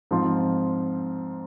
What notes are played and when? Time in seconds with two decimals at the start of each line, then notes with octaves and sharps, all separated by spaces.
0.11 G#2 F3 C4 F4